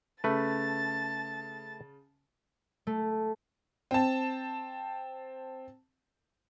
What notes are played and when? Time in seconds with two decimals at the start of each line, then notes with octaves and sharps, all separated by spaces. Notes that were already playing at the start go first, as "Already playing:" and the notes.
0.24 C#3 A3 B4 A5 A6
2.87 A3
3.91 C4 A5